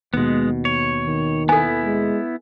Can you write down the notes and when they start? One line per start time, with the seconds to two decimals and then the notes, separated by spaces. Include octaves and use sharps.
0.14 D#2 B2 G#3 B3
0.65 C#5
1.06 D#3
1.49 B3 E4 A4 G#5
1.84 G#3